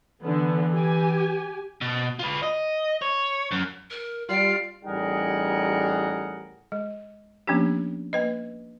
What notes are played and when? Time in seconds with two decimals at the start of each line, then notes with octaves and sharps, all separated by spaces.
0.23 D3 E3 B3
0.74 G4 G#5
1.81 B2
2.19 F4 B4
2.43 D#5
3.02 C#5
3.52 F#2
3.91 A#4
4.29 G3 F4 D5 C7 D7
4.85 A1 G3 D#4 G#4 A#4 F#5
6.72 G#3
7.47 F3 A#3 B3 C#4 D4 G4
8.13 A#3 B4 D#5